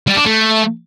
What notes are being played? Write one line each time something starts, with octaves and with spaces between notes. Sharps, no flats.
G3
D4
A3